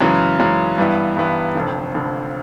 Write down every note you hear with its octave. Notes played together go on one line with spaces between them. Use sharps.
F#2 C#3 E3 G#3
F#2 C#3 E3 G#3
G2 E3 G3 B3 E4
G2 E3 G3 B3 E4
F1 F2 D3
F1 F2 D3